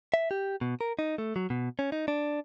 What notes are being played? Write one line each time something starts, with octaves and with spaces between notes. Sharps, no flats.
E5
G4
B2
A#4
D#4
A3
F#3
B2
C#4
D#4
D4